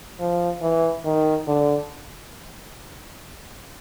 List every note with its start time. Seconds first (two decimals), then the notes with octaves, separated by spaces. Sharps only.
0.20 F3
0.62 E3
1.05 D#3
1.47 D3